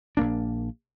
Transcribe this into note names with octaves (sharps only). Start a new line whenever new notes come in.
A#1 A#3 D4